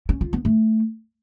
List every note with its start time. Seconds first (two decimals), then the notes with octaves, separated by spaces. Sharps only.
0.09 C#4
0.21 F4
0.33 B3
0.45 A3